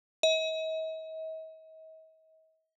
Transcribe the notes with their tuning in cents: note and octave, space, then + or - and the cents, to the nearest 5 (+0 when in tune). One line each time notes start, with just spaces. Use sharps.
D#5 +45